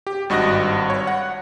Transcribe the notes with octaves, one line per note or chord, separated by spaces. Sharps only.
G4
G#1 G2 F#4 D#5 F#6 A#6
C#5
F#5